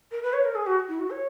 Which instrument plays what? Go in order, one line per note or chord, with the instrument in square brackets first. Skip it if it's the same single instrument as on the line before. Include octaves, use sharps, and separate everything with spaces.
[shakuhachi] A#4
B4
C#5
A#4
G#4
F#4
E4
F#4
C#5